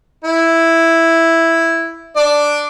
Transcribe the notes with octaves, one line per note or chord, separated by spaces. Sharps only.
E4
D4 D5